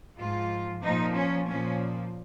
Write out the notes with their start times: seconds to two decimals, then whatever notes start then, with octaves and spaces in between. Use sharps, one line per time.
0.18 G#2 F3 F4
0.82 A#2 F3 D#4
1.15 C#4
1.48 A#2 F3 C#4